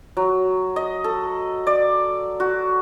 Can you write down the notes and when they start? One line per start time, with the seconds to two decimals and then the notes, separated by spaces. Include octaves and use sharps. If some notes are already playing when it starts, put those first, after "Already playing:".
0.17 F#3
0.76 D#5
1.04 A4
1.67 D5
2.40 F#4